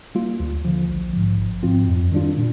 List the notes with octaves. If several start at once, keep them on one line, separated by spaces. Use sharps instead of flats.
G3 A#3 F4
D2
D3 F3
A#1
G#2 F3
G#1
G#2 F3 C4 F4
F2
D#3 G3 D4 F4
A#2